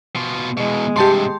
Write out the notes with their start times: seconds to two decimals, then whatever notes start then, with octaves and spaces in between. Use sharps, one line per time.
0.16 B2 F4
0.57 E2 B2 G#3
0.96 G2 C3 G4 A5 C6